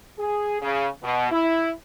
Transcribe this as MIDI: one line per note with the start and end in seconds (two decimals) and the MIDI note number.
0.19 0.59 68
0.61 0.88 49
1.03 1.31 47
1.31 1.72 64